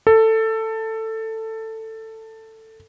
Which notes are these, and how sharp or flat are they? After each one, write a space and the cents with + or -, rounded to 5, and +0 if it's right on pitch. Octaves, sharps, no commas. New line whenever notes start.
A4 +15